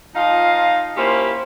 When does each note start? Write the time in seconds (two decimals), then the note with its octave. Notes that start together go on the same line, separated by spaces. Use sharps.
0.15 F3 D#4 F4 D#5 F5
0.97 A#3 C#4 E4 F4 G4 C5